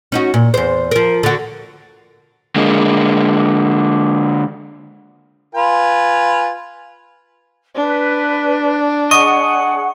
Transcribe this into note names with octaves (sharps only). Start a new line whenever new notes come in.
C#4 D#4 F#4
A#2
E2 C5
F3 A#4
D3 F#4
D3 G#3 A#3
F4 B4 G#5
D4 B4
G#4 D#5 F#5 C#6